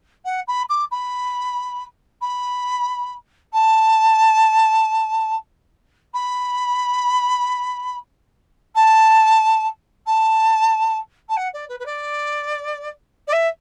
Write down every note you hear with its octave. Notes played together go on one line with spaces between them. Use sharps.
F#5
B5
D6
B5
B5
A5
B5
A5
A5
A5
F#5
D5
B4
B4
D5
D5
E5